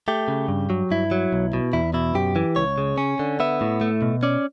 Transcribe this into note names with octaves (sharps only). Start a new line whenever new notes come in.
A3 G4
C#3
G2
F#3
G2 E4
F#3
B1
B2
E2 E4
B2 E4
F#2 G4
E3
C#2 C#5
C#3
C#4
D3
B3 E5
A2
A3
B2
C#4 D5